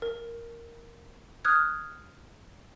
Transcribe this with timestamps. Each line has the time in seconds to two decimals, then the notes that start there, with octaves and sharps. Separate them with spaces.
0.02 A#4
1.45 D#6 F6 F#6 G#6